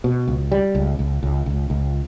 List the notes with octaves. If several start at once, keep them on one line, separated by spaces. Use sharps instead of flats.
B2
C#2
G3
C#2
C#2
C#2
C#2
C#2